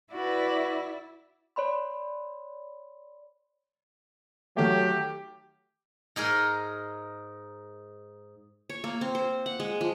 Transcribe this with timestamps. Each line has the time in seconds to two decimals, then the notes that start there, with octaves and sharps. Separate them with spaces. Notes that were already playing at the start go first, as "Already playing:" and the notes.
0.13 E4 F#4 B4 D5
1.56 C#5 D5 B5 C6
4.57 D#3 F#3 A3 G4
6.16 G#2 D#4 G#4 A#4
8.70 C#5
8.84 A#3
9.01 C4
9.15 C5
9.46 F#5
9.60 G#3
9.81 F3